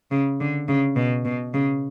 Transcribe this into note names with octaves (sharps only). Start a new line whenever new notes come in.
C#3
D3
C#3
B2
B2
C#3